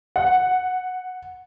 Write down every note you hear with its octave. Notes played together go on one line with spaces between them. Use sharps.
F#5